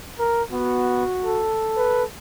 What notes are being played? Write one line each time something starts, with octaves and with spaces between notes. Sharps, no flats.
A#4
B3 F#4
A4
B4